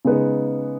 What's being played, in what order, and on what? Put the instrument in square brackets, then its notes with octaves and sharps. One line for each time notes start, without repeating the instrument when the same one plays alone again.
[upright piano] C#3 G#3 B3 D#4